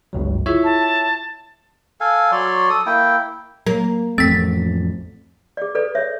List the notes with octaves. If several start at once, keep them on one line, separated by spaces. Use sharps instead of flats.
G1 C#2 F#3
E4 F4 G#4 C#5 E5
A5
A4 F5 G#5
F#3 C#5 D5 C6
A4 D#6
A#3 E4 G5
F#3 A#3
A1 F2 A3 C4 A6 B6
G#4 D5
A4 B4 D5
C#5 E5